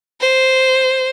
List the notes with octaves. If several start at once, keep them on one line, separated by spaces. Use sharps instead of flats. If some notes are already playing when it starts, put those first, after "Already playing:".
C5